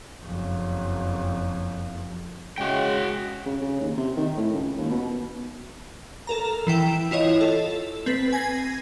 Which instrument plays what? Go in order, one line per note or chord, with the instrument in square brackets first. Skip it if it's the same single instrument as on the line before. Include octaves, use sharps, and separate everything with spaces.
[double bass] F#1 F2
[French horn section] C#3 G#3 [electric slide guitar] F#4 G5
[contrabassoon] C#3
C#3
D#2
C3
D#3
A2
C#2
D#2
B2
[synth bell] A4 A#4 A#5
E3 E4 G5
E4 F4 C#5 D#5
A4
C4 B4 A6 B6
G#5 G#6 A#6 C7